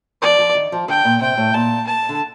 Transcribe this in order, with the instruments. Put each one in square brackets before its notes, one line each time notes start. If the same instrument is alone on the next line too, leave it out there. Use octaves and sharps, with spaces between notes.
[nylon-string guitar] F3 [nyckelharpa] D5
[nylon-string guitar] F3
D#3
F3
[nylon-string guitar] D3 [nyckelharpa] G5
[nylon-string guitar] A#2
[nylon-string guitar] C3 [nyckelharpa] G5
[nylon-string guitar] A2
[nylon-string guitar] A#2 [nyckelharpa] A5
[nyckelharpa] A5
[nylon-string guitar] D3